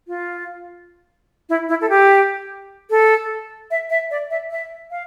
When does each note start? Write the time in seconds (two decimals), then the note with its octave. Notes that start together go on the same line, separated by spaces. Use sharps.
0.08 F4
1.49 E4
1.69 E4
1.81 A4
1.90 G4
2.90 A4
3.71 E5
3.90 E5
4.11 D5
4.30 E5
4.51 E5
4.91 F5